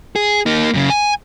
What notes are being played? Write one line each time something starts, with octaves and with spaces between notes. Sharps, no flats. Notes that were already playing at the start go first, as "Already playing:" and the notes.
G#4
A#3 D#4
F#2 C#3
G#5